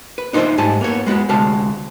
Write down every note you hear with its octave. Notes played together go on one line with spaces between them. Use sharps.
B4
D4 D#4 F4 A#4 C5 E5
G#2 G3 A3 G#5 A5
A#3 B3 C#5
G#3 B3 F#4 B4
D2 C3 G#3 F5 A5